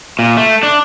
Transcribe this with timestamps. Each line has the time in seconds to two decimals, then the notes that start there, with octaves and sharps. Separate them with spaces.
0.19 A#2
0.37 A3
0.63 D4